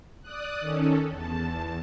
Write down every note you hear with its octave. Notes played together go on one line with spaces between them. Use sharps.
D5 D#6 F#6
D#3 C#4 A4
E2 A5